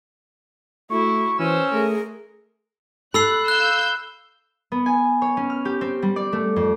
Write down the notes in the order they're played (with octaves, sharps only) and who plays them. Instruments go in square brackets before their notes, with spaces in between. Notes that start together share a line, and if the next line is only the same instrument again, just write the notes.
[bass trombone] A3 [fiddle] E4 [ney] F#4 [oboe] C#6
[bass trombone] E3 [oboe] C#4 [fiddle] C5 E6
[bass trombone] A3 [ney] G#4 [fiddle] A#4
[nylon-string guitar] A4 [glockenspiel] B5 E6 C7 [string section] F#6
[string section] F5 E6 G6 [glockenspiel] F#6
[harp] B3
G#5
C#5
C#4
F6
G4
C4
G3
D5
A3
F2